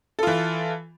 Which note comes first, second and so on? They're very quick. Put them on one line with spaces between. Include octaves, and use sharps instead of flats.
A4 F4 E3